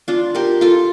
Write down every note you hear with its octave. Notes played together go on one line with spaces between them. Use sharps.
D4 F4
G4 A#4
F4 A4